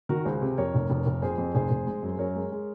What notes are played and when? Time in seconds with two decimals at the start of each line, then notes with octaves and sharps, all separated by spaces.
0.09 D#3 F#4 A#4
0.25 C#2 G#4 C5
0.42 C3
0.57 F2 A#4 C#5
0.74 F1
0.90 F1
1.06 F1
1.22 F2 G#4 C5
1.38 F2
1.54 F1 G#4 C5
1.70 F1
1.87 G#3
2.03 F#2
2.18 F#2 A#4 C#5
2.36 G#3
2.52 G#3